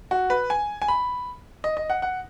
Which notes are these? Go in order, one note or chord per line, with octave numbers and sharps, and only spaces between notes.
F#4
B4
G#5
G#5
B5
D#5
D#5
F#5
F#5